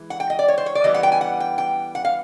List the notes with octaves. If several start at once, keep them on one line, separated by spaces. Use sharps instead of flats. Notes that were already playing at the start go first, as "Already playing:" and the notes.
Already playing: E3 G#3
F#5
G5
D#5
D5
C#5
C5
C#5
D5
E3 G3 B3 D#5
F#5
G5
G#5
F#5
G5
G5
F#5
F5